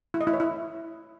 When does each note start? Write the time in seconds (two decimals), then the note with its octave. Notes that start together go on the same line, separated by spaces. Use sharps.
0.14 E4
0.21 D#5
0.27 E4
0.33 C#5
0.40 E4